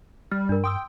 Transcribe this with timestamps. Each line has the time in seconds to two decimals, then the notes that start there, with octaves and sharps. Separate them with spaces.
0.31 G3 F6
0.49 G2 D4 A#4
0.64 G5 C6 D#6 E6